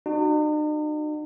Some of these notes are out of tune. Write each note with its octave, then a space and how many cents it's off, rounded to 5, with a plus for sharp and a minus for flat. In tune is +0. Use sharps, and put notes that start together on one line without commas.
D#4 -45 F#4 +0